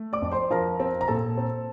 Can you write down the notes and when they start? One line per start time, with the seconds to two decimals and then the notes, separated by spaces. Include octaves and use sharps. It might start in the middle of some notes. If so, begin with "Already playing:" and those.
Already playing: A3
0.13 D5 D6
0.22 F2
0.32 C5 C6
0.51 F3 A#4 A#5
0.80 C4
1.01 A#5
1.08 A#2 A4 A5
1.37 C4